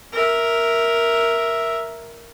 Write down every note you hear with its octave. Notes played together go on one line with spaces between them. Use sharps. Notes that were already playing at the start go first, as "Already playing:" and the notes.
A#4 E5